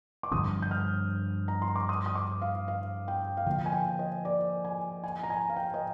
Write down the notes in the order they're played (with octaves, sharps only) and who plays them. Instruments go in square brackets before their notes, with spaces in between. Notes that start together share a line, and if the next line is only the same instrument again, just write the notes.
[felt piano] D6
[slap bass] G2 D3 F3 C4 [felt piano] D#6
[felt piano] G6
F6
A#5
C6
D6
D#6
D#6
D6
F5
F5
G5
F5
[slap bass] D3 F3 A#3 [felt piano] G5
[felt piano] G#5
G5
D#5
D5
G#5
G#5
A#5
G#5
F5
G5
D#5